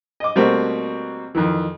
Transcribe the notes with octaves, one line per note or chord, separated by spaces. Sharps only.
D#5 D6
B2 G3 A3 A#3 C4 F#4
F2 D#3 E3